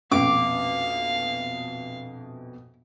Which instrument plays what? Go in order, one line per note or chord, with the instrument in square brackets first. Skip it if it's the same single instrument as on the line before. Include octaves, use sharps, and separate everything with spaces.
[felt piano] A#1 F2 B2 [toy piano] C#4 [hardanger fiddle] F5 [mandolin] D6